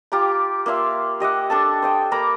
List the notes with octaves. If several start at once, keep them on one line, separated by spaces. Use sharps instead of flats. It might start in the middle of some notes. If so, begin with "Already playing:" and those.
F4 G4 A#5 D6
A#3 F4 E5 C6
G4 D#5 E5 F#5
D4 A4 A5
C5 D#5 G5
A#3 A#5 B5 D6